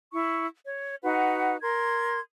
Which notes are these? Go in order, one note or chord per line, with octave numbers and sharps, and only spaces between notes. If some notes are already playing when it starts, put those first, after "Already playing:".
E4 C#6
C#5
D#4 F#4 B4 F#5
A#4 C6 G#6